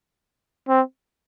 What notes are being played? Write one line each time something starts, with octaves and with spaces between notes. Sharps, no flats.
C4